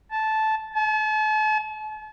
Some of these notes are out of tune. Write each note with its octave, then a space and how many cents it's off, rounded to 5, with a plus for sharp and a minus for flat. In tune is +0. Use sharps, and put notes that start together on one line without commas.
A5 -10
A5 -40